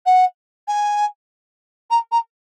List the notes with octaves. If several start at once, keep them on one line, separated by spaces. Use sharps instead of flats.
F#5
G#5
A#5
A#5